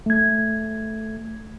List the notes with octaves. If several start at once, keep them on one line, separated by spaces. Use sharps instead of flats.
A3 G#6